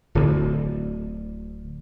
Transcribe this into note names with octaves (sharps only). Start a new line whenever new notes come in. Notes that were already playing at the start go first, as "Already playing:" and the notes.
D1 D2